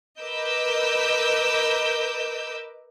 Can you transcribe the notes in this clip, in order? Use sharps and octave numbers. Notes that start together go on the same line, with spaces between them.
A#4 B4 D#5 D6 E6 G6